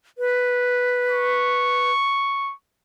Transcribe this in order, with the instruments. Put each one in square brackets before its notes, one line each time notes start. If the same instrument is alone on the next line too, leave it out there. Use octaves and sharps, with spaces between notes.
[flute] B4
[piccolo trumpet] C#6